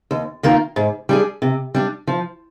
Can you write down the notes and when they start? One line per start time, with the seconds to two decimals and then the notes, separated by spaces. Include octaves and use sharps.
0.11 D#2
0.43 D#3 A#3 F4 A#4
0.76 G#2
1.09 G3 D4 G#4
1.42 C3
1.75 G3 D4
2.07 F3